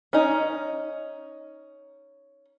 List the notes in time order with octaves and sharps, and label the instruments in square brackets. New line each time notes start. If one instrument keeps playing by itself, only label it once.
[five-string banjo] C#4 D#4